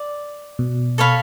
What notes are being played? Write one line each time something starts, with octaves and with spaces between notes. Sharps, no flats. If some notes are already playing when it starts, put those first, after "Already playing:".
Already playing: D5
B2
A4 C#5 F5 B5